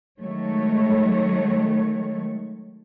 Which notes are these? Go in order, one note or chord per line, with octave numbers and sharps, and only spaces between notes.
D#3 F#3 G#3 A3 C#5